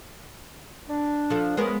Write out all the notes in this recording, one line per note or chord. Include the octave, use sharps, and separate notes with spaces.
D4
F3 A4
G#3 B3 C#4 A#4